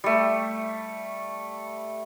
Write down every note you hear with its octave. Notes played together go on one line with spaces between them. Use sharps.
G3 A3